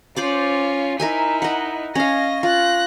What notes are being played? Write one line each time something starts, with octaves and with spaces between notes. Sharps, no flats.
C#4 F4 C5 D5 D6
D#4 E4 A#4 E5 G#5
D#5 F#5
C#4 D#5 F5 A#6
F4 F#6 A#6